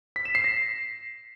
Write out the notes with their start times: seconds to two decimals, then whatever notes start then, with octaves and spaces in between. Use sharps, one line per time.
0.16 B6
0.25 E7
0.35 C7
0.44 A#6